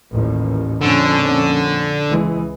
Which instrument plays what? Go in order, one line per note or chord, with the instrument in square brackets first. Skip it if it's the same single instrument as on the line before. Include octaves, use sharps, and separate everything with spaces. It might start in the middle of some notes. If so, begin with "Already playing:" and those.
[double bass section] A1 D#2 A#2
[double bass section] F2 A#2 C#4 [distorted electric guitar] D3
[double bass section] C#2 E3 G#3